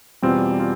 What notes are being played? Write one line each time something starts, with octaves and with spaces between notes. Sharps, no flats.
E2 B2 G3 C4 F4
F4